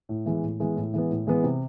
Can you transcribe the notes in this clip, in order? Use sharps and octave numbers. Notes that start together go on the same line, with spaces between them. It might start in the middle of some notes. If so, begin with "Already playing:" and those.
A2
E3 G#3 B3
A2
E3 G#3 B3
A2
E3 G#3 B3
A2
E3 G#3 B3
C3